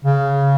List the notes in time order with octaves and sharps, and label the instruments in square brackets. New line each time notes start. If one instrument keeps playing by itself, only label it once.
[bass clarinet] C#3